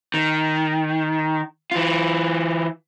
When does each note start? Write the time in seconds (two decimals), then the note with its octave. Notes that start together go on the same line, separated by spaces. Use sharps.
0.14 D#3
1.72 E3 F4